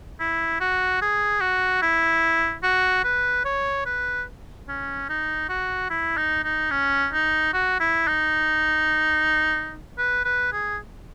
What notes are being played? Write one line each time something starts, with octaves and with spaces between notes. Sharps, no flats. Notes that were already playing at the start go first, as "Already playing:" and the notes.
E4
F#4
G#4
F#4
E4
F#4
B4
C#5
B4
C#4
D#4
F#4
E4
D#4
D#4
C#4
D#4
F#4
E4
D#4
B4
B4
G#4